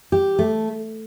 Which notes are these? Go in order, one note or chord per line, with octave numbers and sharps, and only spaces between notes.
G4
A3